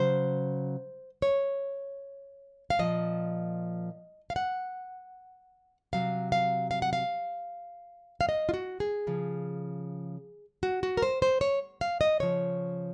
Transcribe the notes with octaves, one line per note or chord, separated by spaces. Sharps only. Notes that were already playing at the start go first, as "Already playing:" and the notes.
Already playing: C#3 F#3 C5
C#5
F5
A#2 F3 D#5
F5
F#5
C3 F#3 F5
F5
F5
F#5
F5
F5
D#5
F4
F#4
G#4
C#3 F3
F#4
F#4
A#4
C5
C5
C#5
F5
D#5
C#3 F3 C#5